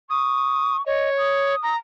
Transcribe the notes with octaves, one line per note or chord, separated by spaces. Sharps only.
C#6 D#6
C#5 D#5
D#6
A#5